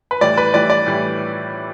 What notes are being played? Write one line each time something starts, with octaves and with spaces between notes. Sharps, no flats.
B4
A2 E3 G3 D5
B4
A2 E3 G3 D5
D5
A2 E3 G3